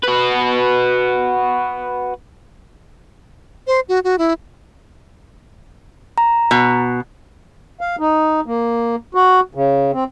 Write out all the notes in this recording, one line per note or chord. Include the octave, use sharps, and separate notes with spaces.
F#4 B4
C5
F#4
F#4
E4
A#5
B2
F5
D#4
A#3
F#4
C#3
C4